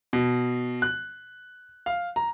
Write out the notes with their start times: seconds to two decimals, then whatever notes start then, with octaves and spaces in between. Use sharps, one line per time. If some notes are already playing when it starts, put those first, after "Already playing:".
0.13 B2
0.82 F#6
1.86 F5
2.16 A#5